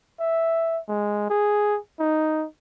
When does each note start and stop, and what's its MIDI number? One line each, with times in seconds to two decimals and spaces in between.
0.20 0.80 76
0.89 1.26 56
1.30 1.78 68
2.00 2.47 63